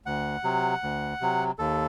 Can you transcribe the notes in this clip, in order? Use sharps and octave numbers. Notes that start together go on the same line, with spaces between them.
D2 F#5
C3 F#3
D2
C3 F#3
D#2 A4